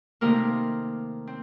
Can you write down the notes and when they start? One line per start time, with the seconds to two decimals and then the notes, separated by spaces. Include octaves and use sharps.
0.21 C3 D#3 A3 A#3 C4 A#4
1.27 C4